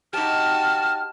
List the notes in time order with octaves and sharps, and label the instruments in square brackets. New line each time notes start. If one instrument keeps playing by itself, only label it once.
[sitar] D#4 G4 [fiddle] F#4 A5 [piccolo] F6